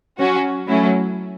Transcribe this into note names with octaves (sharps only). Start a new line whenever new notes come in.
F#3 C#4 F#4
F#3 A3 C#4 E4